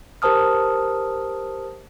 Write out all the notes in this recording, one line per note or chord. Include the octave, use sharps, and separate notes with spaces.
G4 A#4 C5 A5 D#6 F6